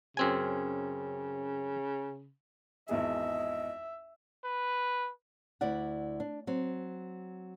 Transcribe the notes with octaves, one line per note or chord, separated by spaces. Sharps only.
F#2 C#3 C4 G#5
G#1 E2 G#4 D#5 E5
B4
D2 E4 D5 F#5
D4
F#3 C4